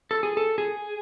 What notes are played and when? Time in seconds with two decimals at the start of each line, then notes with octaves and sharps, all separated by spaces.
0.11 A4
0.23 G#4
0.37 A4
0.58 G#4